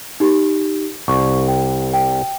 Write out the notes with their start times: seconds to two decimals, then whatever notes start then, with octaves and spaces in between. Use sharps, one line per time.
0.20 D#4 G4
1.08 C2 C#6
1.48 G5
1.93 G5